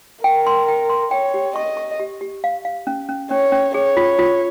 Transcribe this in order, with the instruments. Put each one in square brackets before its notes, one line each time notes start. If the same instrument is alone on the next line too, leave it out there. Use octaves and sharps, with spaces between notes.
[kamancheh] A#4 [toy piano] G5
[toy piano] C6
G5
C6
[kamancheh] C#5 [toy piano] G5
[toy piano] G4
[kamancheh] D#5 [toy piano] C#6
[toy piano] C#6
G4
G4
F5
F5
C#4
C#4
[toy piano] C#4 [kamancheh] C#5
[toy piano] C#4
[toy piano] G#4 [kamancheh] C#5
[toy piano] F4
F4